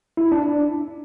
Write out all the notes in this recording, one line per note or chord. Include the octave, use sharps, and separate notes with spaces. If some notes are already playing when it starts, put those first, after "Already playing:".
E4
D4